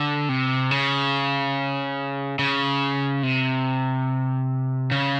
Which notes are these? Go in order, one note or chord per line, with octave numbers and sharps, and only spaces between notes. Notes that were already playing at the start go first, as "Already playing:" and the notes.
Already playing: D3
C3
C#3
C#3
C3
C#3